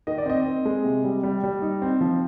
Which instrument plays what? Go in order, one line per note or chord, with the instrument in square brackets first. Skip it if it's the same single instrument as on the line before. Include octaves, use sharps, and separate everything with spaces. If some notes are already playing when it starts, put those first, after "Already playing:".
[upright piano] D#3 D#5
D5
C4 D#5
C4
G#3
C3
G3
G3
G3
D#4
C4
F3